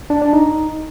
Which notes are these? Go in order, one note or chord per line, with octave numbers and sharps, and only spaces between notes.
D4
D4
D#4